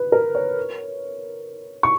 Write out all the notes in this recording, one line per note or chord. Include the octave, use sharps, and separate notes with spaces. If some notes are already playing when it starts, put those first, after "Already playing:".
Already playing: B4
A#4
C#5
C#6